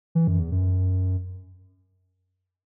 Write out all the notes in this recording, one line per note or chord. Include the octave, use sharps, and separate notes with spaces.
E3
F#2
E2
F#2